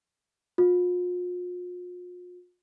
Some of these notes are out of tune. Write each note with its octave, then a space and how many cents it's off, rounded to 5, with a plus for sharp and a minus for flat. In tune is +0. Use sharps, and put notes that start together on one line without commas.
F4 +40